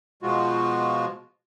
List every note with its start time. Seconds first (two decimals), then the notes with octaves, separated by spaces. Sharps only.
0.23 B2 F3 G#3 F4 F#4